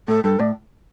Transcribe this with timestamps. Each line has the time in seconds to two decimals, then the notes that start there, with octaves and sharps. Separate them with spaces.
0.08 A2 A4
0.24 G2 A4
0.39 A2 D5